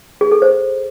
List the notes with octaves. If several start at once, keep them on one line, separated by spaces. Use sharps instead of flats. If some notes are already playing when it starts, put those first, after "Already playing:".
G#4
A4
C5